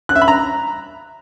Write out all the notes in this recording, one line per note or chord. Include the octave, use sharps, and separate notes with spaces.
F#6
E5
B5
A#5